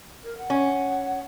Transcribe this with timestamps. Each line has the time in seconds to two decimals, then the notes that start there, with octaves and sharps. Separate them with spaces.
0.24 A#4
0.38 F#5
0.50 C#4